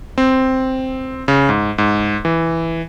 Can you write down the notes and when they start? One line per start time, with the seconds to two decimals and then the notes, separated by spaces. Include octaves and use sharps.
0.18 C4
1.28 C#3
1.49 G#2
1.78 G#2
2.25 E3